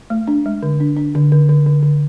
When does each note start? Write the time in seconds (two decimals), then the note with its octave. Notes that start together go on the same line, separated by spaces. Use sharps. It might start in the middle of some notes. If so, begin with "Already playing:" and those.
0.10 A3
0.28 D4
0.46 G#3
0.63 D3
0.80 D4
0.97 D4
1.15 D3
1.32 D3
1.49 D3
1.66 D3
1.83 D3